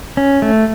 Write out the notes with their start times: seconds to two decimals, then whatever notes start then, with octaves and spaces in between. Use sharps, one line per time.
0.17 C#4
0.42 A3